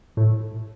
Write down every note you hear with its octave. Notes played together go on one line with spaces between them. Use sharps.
A2